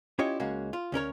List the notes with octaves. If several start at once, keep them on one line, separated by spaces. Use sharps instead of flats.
C#4 E4 F4 G4 C#5 D#5
C#2 G#3 A#3 C#4 F#4
F4
D2 C#4 A#4 C#5